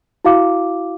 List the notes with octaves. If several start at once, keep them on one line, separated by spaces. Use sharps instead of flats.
E4 F#4 F5 D6